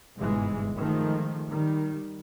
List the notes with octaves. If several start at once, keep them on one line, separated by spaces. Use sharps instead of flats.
G1 G#2 B2 E3 G#3
D#3 F3 G#3 A3
D#3 G3